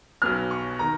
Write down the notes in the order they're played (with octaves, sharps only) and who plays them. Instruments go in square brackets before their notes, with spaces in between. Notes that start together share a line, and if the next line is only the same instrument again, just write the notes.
[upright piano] B1 B2 F#3 F6
C#6
D#3 A#5